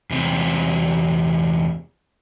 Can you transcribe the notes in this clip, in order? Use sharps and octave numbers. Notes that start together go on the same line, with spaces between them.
E2 C3